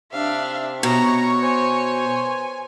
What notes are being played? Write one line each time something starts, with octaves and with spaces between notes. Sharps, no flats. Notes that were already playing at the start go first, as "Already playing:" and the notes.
C3 D4 E5 F5
B2 C#5 A#5 C#6
C5 G#5